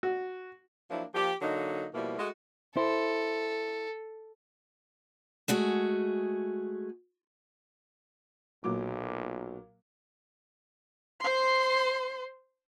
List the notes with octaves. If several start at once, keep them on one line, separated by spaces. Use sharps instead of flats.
F#4
F3 F#3 A#3 D4 E4
F3 A#3 G4
D3 F#3 A#3 D#4
B2 F3 G3 A#3 E4
G#3 A3 F#4
E4 A4 C5
G#3 A3 F#4 G#4
B1 A#2 F#3 D6
C5 C6